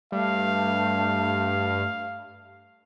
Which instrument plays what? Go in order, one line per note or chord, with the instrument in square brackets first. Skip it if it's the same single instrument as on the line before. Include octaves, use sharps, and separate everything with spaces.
[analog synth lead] G2 [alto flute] A3 [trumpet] F5